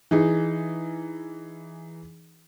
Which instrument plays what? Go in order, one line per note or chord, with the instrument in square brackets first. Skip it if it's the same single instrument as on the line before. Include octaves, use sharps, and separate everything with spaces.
[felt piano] E3 D#4 G#4